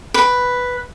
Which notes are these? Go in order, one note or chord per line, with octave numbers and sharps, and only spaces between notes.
B4 B5